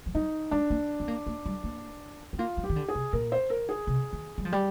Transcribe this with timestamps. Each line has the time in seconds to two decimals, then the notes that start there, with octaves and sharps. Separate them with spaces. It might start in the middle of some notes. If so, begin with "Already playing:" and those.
0.06 F3
0.15 G3 D#4
0.51 G#3 D4
0.70 A#3
1.00 C4
1.08 A#3
1.27 A#3
1.46 G3
1.64 A#3
2.33 C4
2.39 A#3 F4
2.57 G3
2.64 G4
2.70 D#3
2.76 D3
2.89 G#4
2.95 C3
3.13 A#2 A#4
3.32 C5
3.50 A#4
3.69 G#4
3.87 C3
4.13 D#3
4.38 G3
4.45 F3
4.52 G3